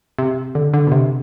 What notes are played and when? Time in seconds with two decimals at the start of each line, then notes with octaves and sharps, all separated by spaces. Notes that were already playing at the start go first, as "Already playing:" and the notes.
0.19 C3
0.55 D3
0.74 D3
0.87 B2
0.92 C3